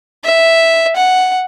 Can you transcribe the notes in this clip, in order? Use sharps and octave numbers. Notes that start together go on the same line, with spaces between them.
E5
F#5